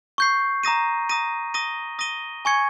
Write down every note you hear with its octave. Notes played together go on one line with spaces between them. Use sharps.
C#6 G6 C7
A#5 D#6 A#6 D#7
A#5 D#6 A#6 D#7
D#6 A#6 D#7 G7
D#6 A#6 D#7 G7
G#5 C#6 G#6 C#7